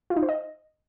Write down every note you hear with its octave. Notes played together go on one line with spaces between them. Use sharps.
F4
D#4
C5
D#5